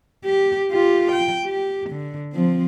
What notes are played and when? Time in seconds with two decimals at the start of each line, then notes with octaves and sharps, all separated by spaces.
0.25 G4
0.71 F4 G4
1.12 G5
1.45 G4
1.90 D3
2.33 F3 C4